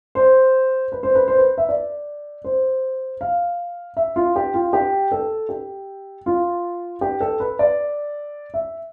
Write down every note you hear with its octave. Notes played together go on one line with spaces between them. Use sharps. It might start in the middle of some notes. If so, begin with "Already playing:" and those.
C5
B4
C5
B4
C5
B4
E5
D5
C5
F5
E5
F4
G4
F4
G4
A4
G4
F4
G4
A4
B4
D5
E5